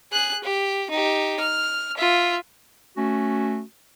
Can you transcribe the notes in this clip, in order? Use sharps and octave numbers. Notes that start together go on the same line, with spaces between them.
G#4 F#6
G4
D#4 G4
F6
F4 E5
A3 C#4 F#4